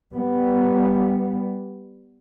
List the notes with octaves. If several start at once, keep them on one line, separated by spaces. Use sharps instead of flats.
G3 B3